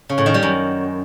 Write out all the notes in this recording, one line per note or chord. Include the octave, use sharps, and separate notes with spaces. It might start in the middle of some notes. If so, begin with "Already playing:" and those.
C#3
A2
D#3
G3
F#2